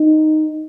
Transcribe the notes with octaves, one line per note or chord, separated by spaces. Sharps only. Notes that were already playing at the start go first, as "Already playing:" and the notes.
Already playing: D#4